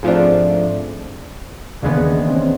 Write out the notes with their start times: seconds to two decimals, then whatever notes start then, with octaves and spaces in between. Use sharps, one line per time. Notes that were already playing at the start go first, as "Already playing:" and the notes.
0.03 G#2 F3 A3 C4 D4
1.82 D#2 C#3 E3 G#3 B3 D4
2.05 D4
2.28 C4
2.35 C#4
2.41 C4